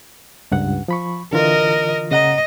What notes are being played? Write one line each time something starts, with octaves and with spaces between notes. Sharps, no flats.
C#2 G2 F#5
F3 B5 C#6
D3 E3 F4 A#4 D#5
C#3 D#5 F#5 A#5